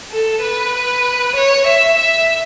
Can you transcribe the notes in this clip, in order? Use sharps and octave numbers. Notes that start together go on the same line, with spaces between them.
A4
B4
C#5
E5
E5